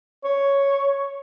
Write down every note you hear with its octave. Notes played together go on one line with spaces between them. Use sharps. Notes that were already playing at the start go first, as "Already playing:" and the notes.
C#5